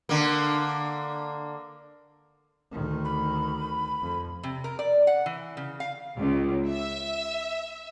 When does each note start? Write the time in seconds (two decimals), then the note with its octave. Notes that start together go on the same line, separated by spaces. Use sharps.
0.09 D3 A#3
2.72 D2 D#3
3.05 B5
4.02 F2
4.43 C3
4.64 A#4
4.79 D5
5.07 F#5
5.26 E3
5.57 C#3
5.80 F5
6.17 C#2
6.69 E5